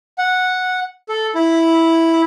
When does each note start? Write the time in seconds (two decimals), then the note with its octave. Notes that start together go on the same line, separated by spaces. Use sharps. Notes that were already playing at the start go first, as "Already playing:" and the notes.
0.18 F#5
1.09 A4
1.35 E4